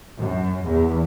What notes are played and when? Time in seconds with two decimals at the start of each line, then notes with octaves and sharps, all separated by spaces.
0.18 F#2
0.67 E2